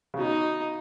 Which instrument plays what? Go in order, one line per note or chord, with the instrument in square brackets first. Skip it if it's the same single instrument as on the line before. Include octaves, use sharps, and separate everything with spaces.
[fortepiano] C#3
[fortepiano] B2 [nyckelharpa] D#4